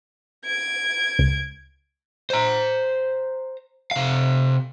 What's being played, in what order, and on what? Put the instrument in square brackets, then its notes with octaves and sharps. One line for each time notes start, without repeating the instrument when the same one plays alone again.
[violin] G#6 D7
[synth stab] C#2
[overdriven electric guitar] C5 A#5
C3 F5